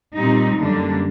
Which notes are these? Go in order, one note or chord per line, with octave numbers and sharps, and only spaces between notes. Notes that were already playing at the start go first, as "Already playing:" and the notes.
A#2 G3 C4 D#4 G4
F#2 D3 G3 A#3 D4